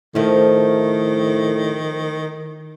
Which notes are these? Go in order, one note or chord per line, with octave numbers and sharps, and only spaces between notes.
A2 D#3 F3 A3